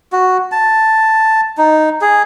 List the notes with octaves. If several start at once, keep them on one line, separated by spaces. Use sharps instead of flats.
F#4
A5
D#4
G#4